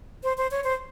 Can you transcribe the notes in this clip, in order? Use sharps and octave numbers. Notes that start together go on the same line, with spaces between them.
C5
C5
C#5
C5